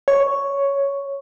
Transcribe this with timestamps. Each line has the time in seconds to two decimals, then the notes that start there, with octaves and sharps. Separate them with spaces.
0.08 C#5